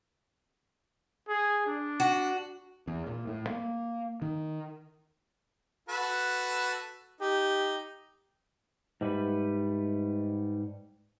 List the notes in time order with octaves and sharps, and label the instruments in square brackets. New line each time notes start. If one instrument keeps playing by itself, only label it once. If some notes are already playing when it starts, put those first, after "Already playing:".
[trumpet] G#4
D4
[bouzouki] F#4
[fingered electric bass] E2
A#2
A2
A#3
D#3
[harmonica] F#4 A4 B4
[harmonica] D#4 [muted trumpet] G4
[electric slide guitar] G#2 G3 A3 B4